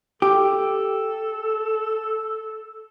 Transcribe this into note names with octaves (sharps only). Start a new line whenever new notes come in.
G4 A4